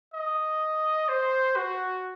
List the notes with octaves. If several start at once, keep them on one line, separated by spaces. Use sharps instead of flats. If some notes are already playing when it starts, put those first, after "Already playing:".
D#5
C5
F#4